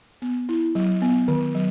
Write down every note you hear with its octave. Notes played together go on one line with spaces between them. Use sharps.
B3
E4
F#3
B3
D#3
F#3